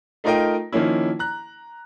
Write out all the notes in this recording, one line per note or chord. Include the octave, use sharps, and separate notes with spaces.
A3 D#4 F4 A#4 D#5 G5
D#3 F3 A#3 C#4 E4
A#5 F#6